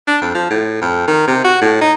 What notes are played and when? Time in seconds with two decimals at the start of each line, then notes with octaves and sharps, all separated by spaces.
0.08 D4
0.22 F2
0.34 F3
0.51 A2
0.81 F2
1.08 D#3
1.28 C3
1.44 F#4
1.61 A2
1.81 D#4